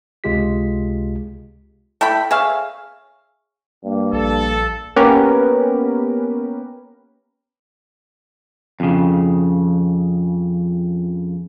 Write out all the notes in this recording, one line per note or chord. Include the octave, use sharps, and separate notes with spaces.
C#2 C3 G#3 F4 G4 B6
A3 E4 G5 B5
G#4 C#5 E5 F5
G2 A#3
A#1 A4
A#3 B3 C#4 G4 A#4 B4
F2 C#3